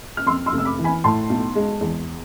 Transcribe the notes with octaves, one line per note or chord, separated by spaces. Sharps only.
F6
F2 C6 E6
C6 E6
F1
E6
B5 D6
E3
G#5 B5
A2 A5 C6
B1
G#3
E2